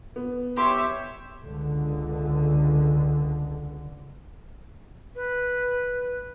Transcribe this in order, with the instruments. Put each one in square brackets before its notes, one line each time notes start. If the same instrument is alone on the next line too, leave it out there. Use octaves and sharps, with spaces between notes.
[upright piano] B3
[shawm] G4 [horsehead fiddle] C#5 E5 [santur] C6
[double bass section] C#2 D3
[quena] B4